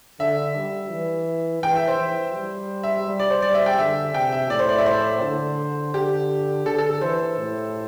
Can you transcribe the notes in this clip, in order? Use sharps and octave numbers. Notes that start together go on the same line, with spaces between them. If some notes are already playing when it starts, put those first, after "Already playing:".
D3 E5
G3
E3
E3 G5
E5
C5
E3
G3
E5
G3
D5
C5
G3 D5
E5
G5
D3 E5
C3 G5
E5
A2 D5
C5
D5
E5
C5
D3
D3 G4
D3 A4
A4
A4
E3 C5
A2